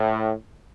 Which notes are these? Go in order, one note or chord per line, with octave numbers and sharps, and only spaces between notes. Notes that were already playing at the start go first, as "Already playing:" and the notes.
Already playing: A2